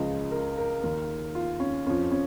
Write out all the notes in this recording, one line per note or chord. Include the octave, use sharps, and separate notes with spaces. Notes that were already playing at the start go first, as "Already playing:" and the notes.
Already playing: C#2 C#3 F3 D#5
A#4
A#4
D#2 D#3 A#4
F4
C#4
F2 F3 C#4
C#4